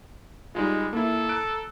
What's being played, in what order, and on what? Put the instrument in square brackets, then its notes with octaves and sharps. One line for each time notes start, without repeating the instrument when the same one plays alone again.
[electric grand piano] G3 D#4 F4 [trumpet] G#3
[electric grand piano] A#3 E4 [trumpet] A4
[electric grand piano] A#5 F#6 D7